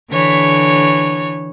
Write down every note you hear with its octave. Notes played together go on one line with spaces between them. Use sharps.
D3 E3 C#5